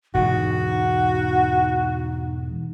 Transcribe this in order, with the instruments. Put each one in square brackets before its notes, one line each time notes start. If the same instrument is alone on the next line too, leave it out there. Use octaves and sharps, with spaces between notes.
[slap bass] E1 G#2 [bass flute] D#4 [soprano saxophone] F#4